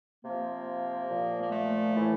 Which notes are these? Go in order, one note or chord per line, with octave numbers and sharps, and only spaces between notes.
C3 F3 A#3
A#2 F3
A#3
A3
A2 E3